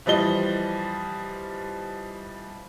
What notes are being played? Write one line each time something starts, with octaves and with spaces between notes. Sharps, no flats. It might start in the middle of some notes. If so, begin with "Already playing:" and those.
E3 F3 G3 D#5 G7